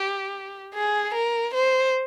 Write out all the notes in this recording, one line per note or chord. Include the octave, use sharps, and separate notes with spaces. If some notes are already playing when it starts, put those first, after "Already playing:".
Already playing: G4
G#4
A#4
C5